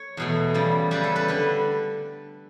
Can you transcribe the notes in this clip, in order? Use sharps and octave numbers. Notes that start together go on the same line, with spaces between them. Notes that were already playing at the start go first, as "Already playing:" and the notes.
Already playing: C#5
E2 B2 A3
E2 C#3 G3
E2 C#3 G3 B4
A4
B4
D3 G3 B4